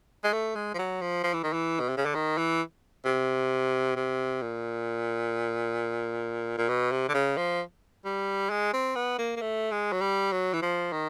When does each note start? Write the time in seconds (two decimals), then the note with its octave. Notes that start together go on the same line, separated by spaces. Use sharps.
0.24 G#3
0.33 A3
0.55 G#3
0.74 F3
0.79 F#3
1.01 F3
1.23 F3
1.34 E3
1.43 D#3
1.53 E3
1.80 B2
1.89 C3
1.97 C#3
2.06 D3
2.15 D#3
2.38 E3
3.05 C3
3.96 C3
4.42 A#2
6.58 A#2
6.69 B2
6.92 C3
7.09 D3
7.14 C#3
7.37 F3
8.05 G3
8.50 G#3
8.73 C4
8.96 B3
9.19 A#3
9.37 A#3
9.41 A3
9.71 G#3
9.92 F#3
10.01 G3
10.32 F#3
10.53 E3
10.62 F3
10.92 D#3